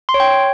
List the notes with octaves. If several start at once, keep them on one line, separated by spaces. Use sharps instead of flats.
C6
C#5
G5